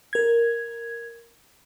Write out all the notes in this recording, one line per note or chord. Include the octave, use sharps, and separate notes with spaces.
A#4 G#6